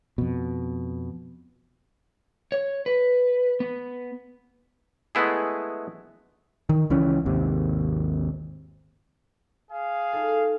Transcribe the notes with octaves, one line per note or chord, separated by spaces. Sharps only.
F2 B2
C#5
B4
B3
G#3 A3 B3 E4 G#4
D#3
C#2 E3 C#4
G#1 D#2 C3
G#4 F5
D#4 F4 A4